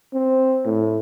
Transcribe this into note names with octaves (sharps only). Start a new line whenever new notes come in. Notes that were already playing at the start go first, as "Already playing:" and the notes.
C4
A2